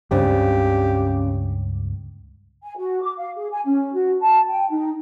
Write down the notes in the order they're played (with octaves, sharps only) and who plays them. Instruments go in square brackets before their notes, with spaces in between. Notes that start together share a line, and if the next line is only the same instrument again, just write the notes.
[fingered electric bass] C#2 G2 [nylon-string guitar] C#3 C4 D4 [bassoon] G4
[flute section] G#5
F#4
D6
F5
G#4
G#5
C#4
F#4
A5
G5
D#4